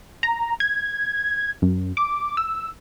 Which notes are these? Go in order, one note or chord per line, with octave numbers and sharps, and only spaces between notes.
A#5
G#6
F#2
D6
E6